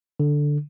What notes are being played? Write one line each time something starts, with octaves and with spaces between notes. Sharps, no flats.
D3